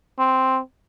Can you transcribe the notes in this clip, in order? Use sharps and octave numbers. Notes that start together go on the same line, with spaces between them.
C4